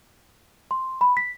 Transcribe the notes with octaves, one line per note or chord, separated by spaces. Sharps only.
C6
B5
B6